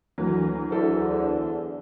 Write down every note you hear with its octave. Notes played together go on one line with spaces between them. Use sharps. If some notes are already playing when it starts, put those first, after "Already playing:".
D2 E3 F#3
E2 D3 E4 A4 C5